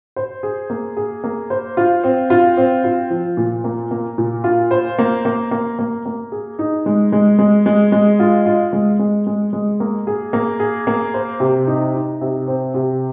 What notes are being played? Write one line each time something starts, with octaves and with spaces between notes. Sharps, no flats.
C5
G#4
A#3
G#4
A#3
C5
F4
C4
F4
C4
F4
F3
A#2
A#3
A#3
A#2
F4
C5
A#3
A#3
A#3
A#3
A#3
G#4
D#4
G#3
G#3
G#3
G#3
G#3
F4
F4
G#3
G#3
G#3
G#3
A#3
G#4
A#3
G#4
A#3
C5
C3
D#4
D#4
C3
C4
C3